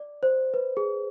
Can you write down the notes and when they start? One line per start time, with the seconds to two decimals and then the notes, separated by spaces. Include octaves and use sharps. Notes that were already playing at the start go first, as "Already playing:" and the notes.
Already playing: D5
0.23 C5
0.54 B4
0.77 G#4